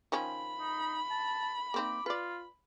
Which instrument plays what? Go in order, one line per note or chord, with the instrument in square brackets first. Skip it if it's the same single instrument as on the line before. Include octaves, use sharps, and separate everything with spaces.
[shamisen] D#3 F3 C#4 [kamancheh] B5
[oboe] D#4
A5
[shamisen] A#3 C4 D#4 [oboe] D6
[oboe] F4 [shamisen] B4 D5